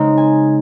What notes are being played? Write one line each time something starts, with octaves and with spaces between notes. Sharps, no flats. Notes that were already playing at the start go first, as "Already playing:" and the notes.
Already playing: C#3 G#3 C4 D#4
G#5